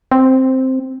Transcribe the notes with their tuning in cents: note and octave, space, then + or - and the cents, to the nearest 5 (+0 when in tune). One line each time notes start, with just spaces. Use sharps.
C4 +0